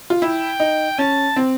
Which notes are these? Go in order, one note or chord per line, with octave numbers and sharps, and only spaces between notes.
F4
E4 G5
D#4
C#4 A5
C4